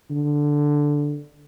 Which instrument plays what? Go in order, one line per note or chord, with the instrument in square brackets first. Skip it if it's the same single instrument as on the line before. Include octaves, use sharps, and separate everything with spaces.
[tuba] D3